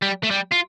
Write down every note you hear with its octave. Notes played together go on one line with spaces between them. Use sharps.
G3
A3
G3
F4